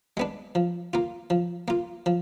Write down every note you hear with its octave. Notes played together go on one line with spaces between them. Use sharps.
G#3 B3 D4
F3
A#3 F4
F3
A#3 F4
F3